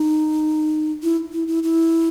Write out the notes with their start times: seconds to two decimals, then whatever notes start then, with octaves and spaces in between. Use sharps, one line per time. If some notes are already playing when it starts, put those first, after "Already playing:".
Already playing: D#4
1.03 E4
1.32 E4
1.47 E4
1.63 E4